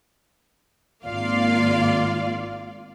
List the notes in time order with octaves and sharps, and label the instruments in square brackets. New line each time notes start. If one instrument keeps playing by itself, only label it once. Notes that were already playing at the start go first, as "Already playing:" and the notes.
[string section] G#1 A#3 F4 D5 F5